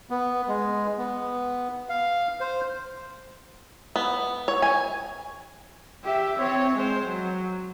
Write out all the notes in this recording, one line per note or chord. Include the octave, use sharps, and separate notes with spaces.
B3
G#3
B3
F5
C5
B3
C#5
G#5
G4 E5
C4 C#5
G#3 C5
F#3